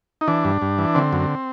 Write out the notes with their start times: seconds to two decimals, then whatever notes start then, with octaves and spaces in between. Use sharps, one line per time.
0.21 D#4
0.28 E3 D4
0.45 G2
0.62 G2
0.78 E3
0.95 D3 C4
1.13 F#2